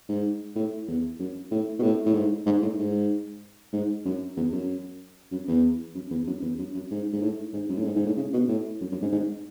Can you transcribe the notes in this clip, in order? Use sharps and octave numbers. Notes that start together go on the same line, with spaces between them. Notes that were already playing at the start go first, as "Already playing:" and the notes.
G#2
A2
E2
F#2
A2
B2
A2
A2
G#2
G#2
A2
G#2
G#2
F#2
E2
F#2
F#2
E2
F#2
E2
F#2
E2
F#2
F#2
G#2
G#2
A2
G#2
F#2
A2
G#2
G#2
A2
C#3
B2
A2
F#2
F#2
G#2
G#2